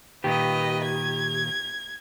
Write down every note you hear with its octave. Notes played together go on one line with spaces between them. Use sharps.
A#2 D#3 G4 B4 D#5
G#6